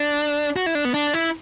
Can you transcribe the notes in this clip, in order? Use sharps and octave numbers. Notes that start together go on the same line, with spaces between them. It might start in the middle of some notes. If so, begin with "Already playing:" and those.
Already playing: D4
F#4
E4
D4
B3
D4
E4